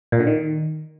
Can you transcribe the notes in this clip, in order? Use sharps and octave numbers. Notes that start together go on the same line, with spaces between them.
A#2
D3
D#3